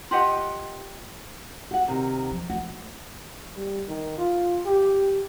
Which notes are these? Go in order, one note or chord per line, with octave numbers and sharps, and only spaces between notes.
F4 G4 D#5 F#5
F#4 F#5
C3 D#3
F3
A3 F#4
G3
D#3
F4
G4